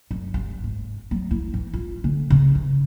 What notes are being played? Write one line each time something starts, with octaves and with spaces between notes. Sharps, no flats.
F#2
G1
G#2
F#3
E4
E3
F4
D3
C#3
E3